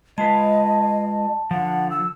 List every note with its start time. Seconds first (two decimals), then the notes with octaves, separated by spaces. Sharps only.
0.18 G#3 F4 B4 D#5 A5
1.51 D3 F3 F#5
1.91 E6